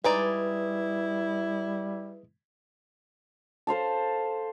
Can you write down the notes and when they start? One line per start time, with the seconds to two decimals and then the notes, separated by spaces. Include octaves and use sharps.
0.04 G3 G#3 D#4 E4 B4 D5
3.67 A4 C5 F5 A5